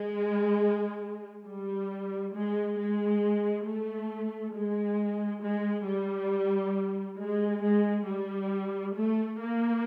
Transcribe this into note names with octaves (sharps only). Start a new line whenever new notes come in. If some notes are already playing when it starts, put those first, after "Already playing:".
Already playing: G#3
G3
G#3
G#3
A3
G#3
G#3
G3
G#3
G#3
G3
A3
A#3